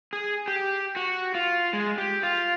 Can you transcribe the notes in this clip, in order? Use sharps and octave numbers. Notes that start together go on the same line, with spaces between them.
G#4
G4
F#4
F4
G#3
G4
F4